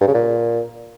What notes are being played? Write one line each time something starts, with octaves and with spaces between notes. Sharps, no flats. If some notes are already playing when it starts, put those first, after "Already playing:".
G2
C#3
A#2